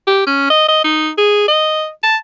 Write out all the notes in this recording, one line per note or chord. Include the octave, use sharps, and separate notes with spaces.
G4
C#4
D#5
D#5
D#4
G#4
D#5
A5